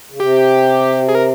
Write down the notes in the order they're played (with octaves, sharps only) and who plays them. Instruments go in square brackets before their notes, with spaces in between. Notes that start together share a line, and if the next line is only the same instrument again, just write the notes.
[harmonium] C#3
[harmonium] C3 [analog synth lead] G4
[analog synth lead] G#4
A#4